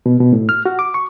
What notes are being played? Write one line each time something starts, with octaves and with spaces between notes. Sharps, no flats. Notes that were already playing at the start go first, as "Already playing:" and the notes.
B2
B2
A2
F6
F#4
D6
C#6